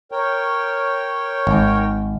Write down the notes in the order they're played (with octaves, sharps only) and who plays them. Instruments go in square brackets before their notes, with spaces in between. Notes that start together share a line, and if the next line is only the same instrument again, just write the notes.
[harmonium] A#4 C#5 G5
[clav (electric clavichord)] G#1